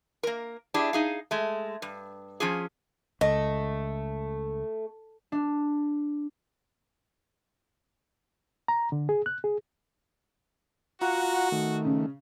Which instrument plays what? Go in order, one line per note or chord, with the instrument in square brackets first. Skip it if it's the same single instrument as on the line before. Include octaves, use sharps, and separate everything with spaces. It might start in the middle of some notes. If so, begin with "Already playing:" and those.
[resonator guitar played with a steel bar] A#3 A#4
D4 E4 G4 G#4
D#4 G#4 F5
G#3 A3
G2
F3 C#4 F4 G#4
[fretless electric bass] C#2 [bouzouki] A3 [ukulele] D#5
[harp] D4
[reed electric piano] A#5
D3
G#4
F#6
G#4
[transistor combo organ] F4 F#5 A#5 [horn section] F#4
[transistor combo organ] D#3 A3
[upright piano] C#3